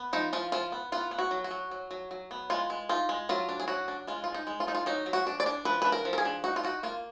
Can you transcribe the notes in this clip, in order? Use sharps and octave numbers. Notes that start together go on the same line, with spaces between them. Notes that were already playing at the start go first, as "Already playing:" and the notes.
Already playing: B3
F3 D#4
F3 F4
F3 F4
B3
B3 F4
B3
F#4
F#3
F#4
F#3
F#3
F#3
F#3
B3
G#3 F4
G#3
D#4 F4
G#3
F#3 F4
D4
G#4
F#3 F#4
D4
G#3 F4
G#3 F4
D#4
G#3
F4
G#3 D#4
F4
F#3 D#4
F#3
F#4
D4
D5
D4
F3 B4
D4 B4
A#4
F3
A#4
G#4
D4
D#4 F#4
F4
D#4 F#4
A#3 F4